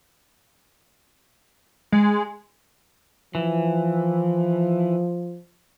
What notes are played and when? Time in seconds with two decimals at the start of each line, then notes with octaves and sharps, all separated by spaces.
1.92 G#3
3.35 E3 F3